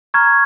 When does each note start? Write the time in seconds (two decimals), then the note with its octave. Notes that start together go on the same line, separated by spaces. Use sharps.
0.14 A#5 C#6 F6 G#6